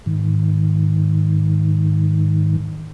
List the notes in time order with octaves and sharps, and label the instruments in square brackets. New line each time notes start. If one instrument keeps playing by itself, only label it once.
[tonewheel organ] G#2 D#3